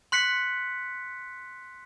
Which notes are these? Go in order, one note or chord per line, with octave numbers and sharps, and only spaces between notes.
C6 F#6 B6 C#7